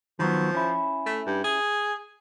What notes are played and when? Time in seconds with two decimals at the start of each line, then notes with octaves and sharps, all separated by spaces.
0.19 D#3 F3 F#3 B3
0.55 C#4 E4
1.06 A3
1.26 G2
1.44 G#4